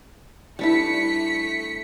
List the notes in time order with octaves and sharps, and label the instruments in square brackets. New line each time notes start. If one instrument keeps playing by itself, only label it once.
[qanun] G3 D4 E4 [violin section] A3 B6 C#7